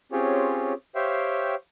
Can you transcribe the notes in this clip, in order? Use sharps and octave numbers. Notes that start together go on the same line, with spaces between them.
C4 C#4 F4 G4 G#4 C#5
G4 C5 C#5 E5 F5 G5